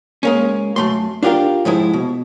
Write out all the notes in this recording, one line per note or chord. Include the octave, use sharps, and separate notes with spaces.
G#3 A#3 C#4
F#2 A3 C6
D4 F4 G4 A#4 F5
G#2 F3 G#3 E4
B2